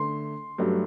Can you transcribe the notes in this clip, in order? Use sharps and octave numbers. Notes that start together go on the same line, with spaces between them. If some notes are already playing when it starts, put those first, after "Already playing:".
Already playing: D3 A3 C6
G2 F#3 A3